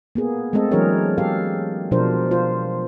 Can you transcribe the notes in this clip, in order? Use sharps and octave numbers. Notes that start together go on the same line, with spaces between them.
A#3 B3 G#4
G#3 A3 C4 A4 D#5
E3 F#3 D4 G#4 A#4 C#5
G4 A4 F5
B2 F3 D4 A#4 C5
F4 C5